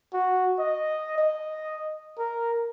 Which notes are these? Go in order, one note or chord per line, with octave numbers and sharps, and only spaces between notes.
F#4
D#5
D#5
A#4